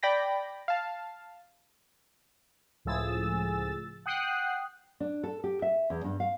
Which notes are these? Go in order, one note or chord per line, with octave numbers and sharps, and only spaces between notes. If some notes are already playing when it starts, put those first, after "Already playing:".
D5 G5 B5 A#6
F5 A5
C#2 A2 F3 G#4 E6 A6
F#5 G5 D#6 F#6 C7
D4
A4
G4
E5
E2
G2
F5